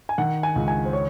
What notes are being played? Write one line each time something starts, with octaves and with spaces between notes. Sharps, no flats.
G#5
D#3 F#5
G#5
C#2
G#5
C5
C#5